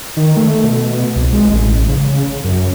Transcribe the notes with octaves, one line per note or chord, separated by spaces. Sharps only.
D#3
A3
B2
C2
G#3
A1
C#3
F#2